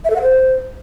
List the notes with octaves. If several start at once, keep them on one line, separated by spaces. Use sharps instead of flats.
E5
A4
F#5
C5